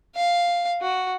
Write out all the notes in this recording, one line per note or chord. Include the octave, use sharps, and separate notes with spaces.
F5
F#4